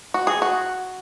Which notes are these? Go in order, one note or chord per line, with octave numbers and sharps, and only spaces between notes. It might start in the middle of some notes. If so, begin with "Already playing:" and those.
F#4
G#4
F#4